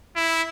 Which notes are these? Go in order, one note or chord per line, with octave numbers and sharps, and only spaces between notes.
E4